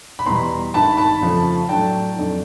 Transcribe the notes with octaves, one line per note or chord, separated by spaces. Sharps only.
B5
E2 B2 G3 A#5 C6
G#1 G2 D#3 A5 B5
A5 B5
F2 C#3 F3 A3 C#4
A2 F#3 A3 D4 G5 A5
F2 D3 F#3 A3 D4